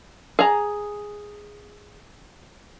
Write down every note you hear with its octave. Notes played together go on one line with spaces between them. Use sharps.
G#4 A#5